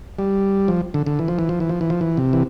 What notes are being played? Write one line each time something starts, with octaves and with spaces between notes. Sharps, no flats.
G3
F3
D3
D3
E3
F3
E3
F3
E3
F3
E3
F3
E3
C3
E3